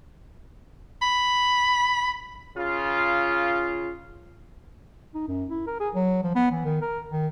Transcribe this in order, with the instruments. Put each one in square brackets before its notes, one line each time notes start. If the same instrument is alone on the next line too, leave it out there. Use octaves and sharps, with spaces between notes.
[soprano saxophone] B5
[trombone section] C#3 F4
[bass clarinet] D#4
F#2
E4
A#4
G#4
F#3
F3
B3
E3
D#3
A#4
D#3